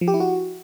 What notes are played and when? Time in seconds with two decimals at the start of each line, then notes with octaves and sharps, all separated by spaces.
0.01 F3
0.08 G4
0.14 E4
0.20 F#4